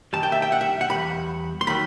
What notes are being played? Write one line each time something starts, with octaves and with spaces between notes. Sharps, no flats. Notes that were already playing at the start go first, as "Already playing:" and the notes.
F#2 D#3 G3 A5
G5
E5
G5
F#5
E5
F#5
E2 B2 G3 B5
C6
D#3 F#3 B5